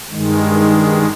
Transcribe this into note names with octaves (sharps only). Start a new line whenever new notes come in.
G2 D#3 G#3